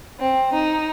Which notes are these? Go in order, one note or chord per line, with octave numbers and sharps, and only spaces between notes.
C4
D#4